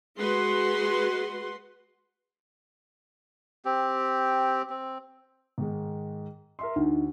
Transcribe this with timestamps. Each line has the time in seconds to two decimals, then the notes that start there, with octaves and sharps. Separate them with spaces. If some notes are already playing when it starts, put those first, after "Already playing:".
0.18 G#3 F#4 B4 F#5 C6
3.65 C4 G4
4.70 C4
5.58 G#2 D#3 G#3
6.59 A#4 E5 C6
6.76 D2 D4 D#4